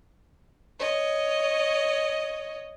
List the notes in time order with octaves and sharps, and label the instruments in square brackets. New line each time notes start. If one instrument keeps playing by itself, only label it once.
[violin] C#5 D#5